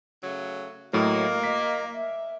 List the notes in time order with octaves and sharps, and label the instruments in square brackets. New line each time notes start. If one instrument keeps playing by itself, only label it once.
[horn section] C#3 F#3 A3
[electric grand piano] A2 F#3 [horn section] A#3 [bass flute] D#5
[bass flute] D#5 [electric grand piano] B6
[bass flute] E5